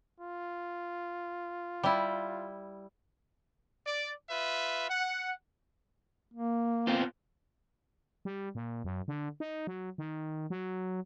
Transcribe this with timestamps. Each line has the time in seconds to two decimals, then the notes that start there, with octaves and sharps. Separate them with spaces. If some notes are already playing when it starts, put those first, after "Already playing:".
0.20 F4
1.83 G3 E4
3.85 D5
4.28 F4 B4 E5
4.89 F#5
6.34 A#3
6.87 B3 C4 F4
8.25 G3
8.55 A#2
8.84 F#2
9.08 D3
9.40 D#4
9.67 F#3
9.98 D#3
10.50 F#3